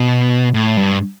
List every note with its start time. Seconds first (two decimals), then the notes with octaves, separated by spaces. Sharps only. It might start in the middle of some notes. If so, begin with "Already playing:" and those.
Already playing: B2
0.54 A2
0.77 G2